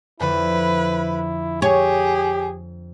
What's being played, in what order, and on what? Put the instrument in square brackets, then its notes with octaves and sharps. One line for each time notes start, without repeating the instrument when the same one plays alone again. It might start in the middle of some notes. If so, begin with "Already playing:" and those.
[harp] F2 D3 [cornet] E4 [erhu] B4
[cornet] G4 [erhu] G#4 [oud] C#5